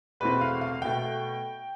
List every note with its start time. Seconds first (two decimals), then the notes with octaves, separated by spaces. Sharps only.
0.20 E2 B2 A3 C4 B4
0.41 F5
0.61 F5
0.82 B2 A3 G5